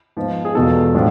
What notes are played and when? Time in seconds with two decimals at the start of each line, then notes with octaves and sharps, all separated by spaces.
0.17 G#2 F3 B3
0.45 G#4
0.55 E1 E2 B2 B3 F4 A4
0.94 A2 F3 G#3 D4 F4